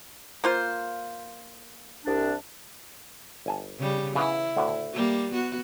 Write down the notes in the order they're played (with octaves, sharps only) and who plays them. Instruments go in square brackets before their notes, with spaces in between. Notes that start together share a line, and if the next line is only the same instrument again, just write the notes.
[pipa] A#3 F4 C5
[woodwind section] C2 D4
[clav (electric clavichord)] G1 G#5 A5
[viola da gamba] C#3 G3
[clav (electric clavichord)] C#3 E3 B3 [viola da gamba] E4
[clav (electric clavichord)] D2 A2 D3
[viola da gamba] G3 A#3
B3 F#4